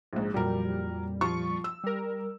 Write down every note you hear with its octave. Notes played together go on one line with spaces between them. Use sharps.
A#1 G#2
F2 A#2 F#3 G3 A#4
F3 F4 C#6
E6
G3 A#4